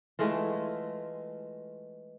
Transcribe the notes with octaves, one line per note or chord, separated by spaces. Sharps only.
E3 G#3 A3 F4